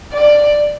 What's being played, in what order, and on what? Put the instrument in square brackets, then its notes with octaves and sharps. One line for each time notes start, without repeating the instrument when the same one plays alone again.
[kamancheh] D5